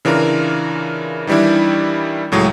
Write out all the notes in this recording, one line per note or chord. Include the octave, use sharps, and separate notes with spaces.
C#3 E3 D4 F4 A#4
D#3 E3 G3 D4 E4
C#2 A2 F#3 G#3